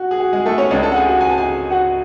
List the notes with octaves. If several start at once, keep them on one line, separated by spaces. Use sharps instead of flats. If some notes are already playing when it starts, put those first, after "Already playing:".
Already playing: F#4
G#4
F#4
G#3 G#4
A3 A4
C#4 C#5
C#2 C#3 G#3 D4 D5
A4 A5
F#5
G#4 G#5
F#4 F#5
G#5
A5
G#4 G#5
F#4 F#5